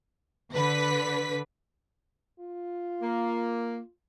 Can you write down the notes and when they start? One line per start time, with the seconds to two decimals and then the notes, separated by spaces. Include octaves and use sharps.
0.53 D3 B4 B6
2.40 F4
3.00 A#3